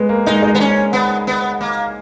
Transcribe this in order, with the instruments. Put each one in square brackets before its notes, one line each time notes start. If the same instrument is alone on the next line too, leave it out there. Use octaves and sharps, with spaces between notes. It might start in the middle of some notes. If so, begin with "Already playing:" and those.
Already playing: [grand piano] G#3 B3
A#3
[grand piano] G#3 [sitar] D#4
[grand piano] G#3
[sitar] B3
C#4
B3
B3
A#3